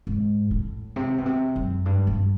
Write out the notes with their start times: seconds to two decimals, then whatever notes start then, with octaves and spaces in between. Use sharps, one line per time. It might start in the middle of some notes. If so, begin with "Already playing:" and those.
0.07 G#2
0.51 A2
0.96 C3
1.18 B2
1.26 C3
1.56 F#2
1.85 G2
2.07 G2